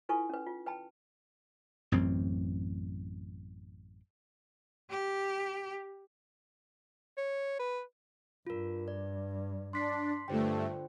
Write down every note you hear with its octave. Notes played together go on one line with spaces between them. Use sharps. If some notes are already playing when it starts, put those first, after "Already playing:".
E4 F4 A4 B4 G#5 C#6
C#4 B4
F4
B4 G5 A5 B5
A1 F#2 C4
G4
C#5
B4
G2 F4 A#4
D5
D4 C6 B6 C7
G2 D3 A3 F4 C5 G5